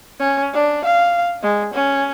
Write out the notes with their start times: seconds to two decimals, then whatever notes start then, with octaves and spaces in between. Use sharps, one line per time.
0.20 C#4
0.53 D4
0.85 F5
1.43 G#3
1.74 C#4